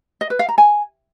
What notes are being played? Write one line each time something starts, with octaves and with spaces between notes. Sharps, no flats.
D#5
B4
F5
A#5
G#5